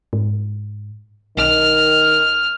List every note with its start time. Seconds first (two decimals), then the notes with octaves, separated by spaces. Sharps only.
0.13 G#2
1.37 B1 D#3 F6